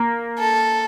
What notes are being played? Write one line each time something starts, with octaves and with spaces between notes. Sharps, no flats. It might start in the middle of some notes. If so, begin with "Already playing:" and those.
Already playing: A#3
A4